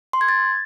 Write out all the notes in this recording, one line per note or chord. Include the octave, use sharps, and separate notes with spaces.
C6
G#6
A6